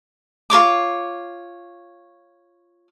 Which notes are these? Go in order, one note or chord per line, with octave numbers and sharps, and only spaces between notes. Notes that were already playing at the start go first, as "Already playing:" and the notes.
F4 A#4 C#5 D6